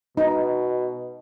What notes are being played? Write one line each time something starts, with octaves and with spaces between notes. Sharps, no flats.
B2 D#4